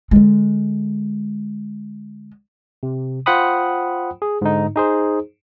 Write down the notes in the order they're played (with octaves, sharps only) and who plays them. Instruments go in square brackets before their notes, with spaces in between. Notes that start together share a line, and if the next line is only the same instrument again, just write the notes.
[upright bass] D3 G#3
[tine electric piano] C3
F4 C5 F#5 G5 B5 D#6
G#4
G#2 D3 D#4
D#4 G#4 C5